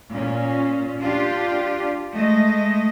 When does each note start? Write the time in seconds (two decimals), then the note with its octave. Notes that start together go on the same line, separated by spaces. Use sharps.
0.14 A#2 C#4
1.00 D4 F4 G4
2.14 G#3 A3 D#5